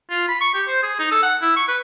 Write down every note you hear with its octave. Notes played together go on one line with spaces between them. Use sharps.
F4
B5
C#6
G4
C5
G#4
D#4
A4
F#5
E4
C#6
B4